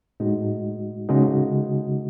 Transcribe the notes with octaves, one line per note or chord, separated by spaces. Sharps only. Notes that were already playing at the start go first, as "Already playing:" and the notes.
A2 G#3 D#4 F#4
C#3 G#3 D#4 F#4